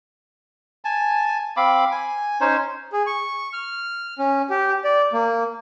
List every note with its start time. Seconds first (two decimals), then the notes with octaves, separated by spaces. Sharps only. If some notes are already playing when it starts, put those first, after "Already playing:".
0.85 G#5 A5
1.57 C4 F5 B5 D6
1.92 G#5
2.41 C#4 D#4 C5 C#5
2.92 G#4
3.07 C#6
3.53 F6
4.19 C#4
4.50 G4
4.84 D5
5.13 A#3